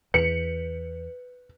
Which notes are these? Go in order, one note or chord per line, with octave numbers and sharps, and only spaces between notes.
E2 B4 C#7